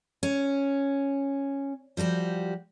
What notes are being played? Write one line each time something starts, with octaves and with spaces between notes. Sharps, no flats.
C#4
F3 G3 F#4 G4